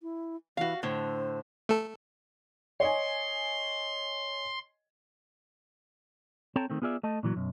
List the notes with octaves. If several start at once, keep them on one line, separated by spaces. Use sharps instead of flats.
E4
E3 F#4 F5
A2 D3 C5
A3 A4
C#5 D#5 G#5 C6
C4 A4 C#5 G5 A5 A#5
D#3 A3 C4
B3 F4 G#4 D5 E5
A3 D#5 A5
A#2 E3 F#3
B1 F#2